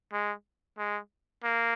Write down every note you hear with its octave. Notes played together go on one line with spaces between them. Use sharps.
G#3
G#3
A#3